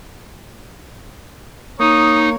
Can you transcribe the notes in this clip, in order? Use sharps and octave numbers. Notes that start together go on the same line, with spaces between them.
A#3 D#4 C#5 D#6